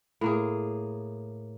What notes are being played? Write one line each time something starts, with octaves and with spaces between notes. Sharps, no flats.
A2 A#3 G#4